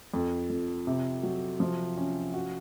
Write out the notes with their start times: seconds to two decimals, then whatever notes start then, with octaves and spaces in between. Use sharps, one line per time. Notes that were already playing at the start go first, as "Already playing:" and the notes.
0.14 F2
0.50 F2
0.87 C3
1.23 F#3
1.60 F3
1.97 C#4
2.34 F#4